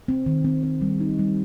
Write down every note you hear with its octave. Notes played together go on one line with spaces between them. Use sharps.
C4
D#3
C4
C4
G3
D#4
G3